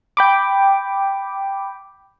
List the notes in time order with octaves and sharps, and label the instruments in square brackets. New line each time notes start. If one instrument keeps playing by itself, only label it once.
[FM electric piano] G5 B5 D6